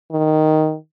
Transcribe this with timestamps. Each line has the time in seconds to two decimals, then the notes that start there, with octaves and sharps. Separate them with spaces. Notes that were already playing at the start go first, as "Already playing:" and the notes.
0.12 D#3